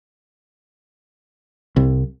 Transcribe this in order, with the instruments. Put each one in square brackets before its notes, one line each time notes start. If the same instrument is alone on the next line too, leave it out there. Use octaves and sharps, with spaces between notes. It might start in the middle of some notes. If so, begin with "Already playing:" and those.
[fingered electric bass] C2